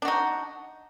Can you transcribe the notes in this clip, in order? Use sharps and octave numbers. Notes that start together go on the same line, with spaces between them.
D4 D#4 F#4